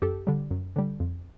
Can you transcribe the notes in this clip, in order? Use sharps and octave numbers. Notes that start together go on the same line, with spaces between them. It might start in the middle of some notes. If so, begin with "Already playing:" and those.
F#2 G4 A4
D3 G3
F#2
D3 G3
F2